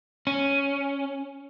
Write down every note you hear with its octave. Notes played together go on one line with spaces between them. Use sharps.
C#4